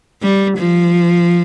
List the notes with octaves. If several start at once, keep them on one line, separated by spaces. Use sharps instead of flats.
G3
F3